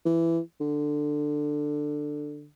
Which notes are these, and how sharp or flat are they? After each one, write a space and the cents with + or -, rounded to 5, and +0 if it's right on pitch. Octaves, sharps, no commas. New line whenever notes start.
E3 +15
D3 +10